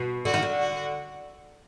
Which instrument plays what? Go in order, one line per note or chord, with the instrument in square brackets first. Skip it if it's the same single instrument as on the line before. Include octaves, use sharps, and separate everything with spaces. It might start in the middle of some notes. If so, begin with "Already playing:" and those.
Already playing: [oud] B2
[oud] D3 [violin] F#4
[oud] D#3
D3
[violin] F#4